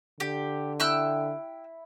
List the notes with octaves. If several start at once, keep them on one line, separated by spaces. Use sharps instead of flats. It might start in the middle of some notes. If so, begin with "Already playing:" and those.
D3 G4
E4 G5 E6 F#6